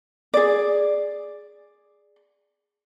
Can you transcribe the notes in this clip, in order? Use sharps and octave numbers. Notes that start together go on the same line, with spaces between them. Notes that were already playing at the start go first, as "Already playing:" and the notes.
G#4 D5